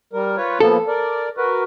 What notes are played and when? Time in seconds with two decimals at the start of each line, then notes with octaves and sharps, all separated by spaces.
0.13 G3 A#4
0.37 F4 B4 C#5
0.60 F3 A#3 B3 A4
0.88 A#4 D5
1.37 F#4 A#4 B4